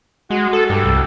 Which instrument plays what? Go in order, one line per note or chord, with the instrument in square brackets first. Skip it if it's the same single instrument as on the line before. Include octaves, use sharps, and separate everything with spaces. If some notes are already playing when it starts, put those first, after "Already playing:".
[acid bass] G#3 [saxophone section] F#4
[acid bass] A4
[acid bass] G2 [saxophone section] G3 G4 A4
[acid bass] C2